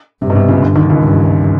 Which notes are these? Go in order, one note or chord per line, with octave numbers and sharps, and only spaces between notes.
G2 C3
B2
C3
C#2 C#3
D2 D3
D#2 D#3
C#2 C#3
G2